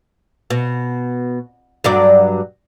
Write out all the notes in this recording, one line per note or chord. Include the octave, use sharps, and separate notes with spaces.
B2
G2 F#3 D5